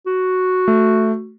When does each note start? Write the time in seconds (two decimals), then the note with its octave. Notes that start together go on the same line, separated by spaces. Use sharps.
0.06 F#4
0.68 A3